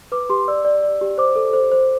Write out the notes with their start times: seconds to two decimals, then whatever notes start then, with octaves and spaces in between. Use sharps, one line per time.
0.12 B4 D6
0.30 G4 C6
0.48 D5 E6
0.65 D5
0.83 D5
1.01 G4
1.18 C5 D6
1.36 A4
1.53 C5
1.72 C5